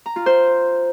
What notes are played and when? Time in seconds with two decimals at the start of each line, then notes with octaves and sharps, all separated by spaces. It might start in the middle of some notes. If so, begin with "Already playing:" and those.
0.06 A#5
0.16 F4
0.26 C5